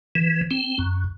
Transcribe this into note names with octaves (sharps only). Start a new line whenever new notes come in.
E3
C4
F#2